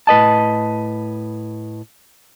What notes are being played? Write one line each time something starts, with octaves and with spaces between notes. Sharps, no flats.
A2 B4 D#5 A5